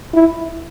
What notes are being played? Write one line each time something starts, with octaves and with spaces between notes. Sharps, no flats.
E4